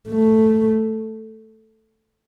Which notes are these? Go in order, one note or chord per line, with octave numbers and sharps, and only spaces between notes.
A3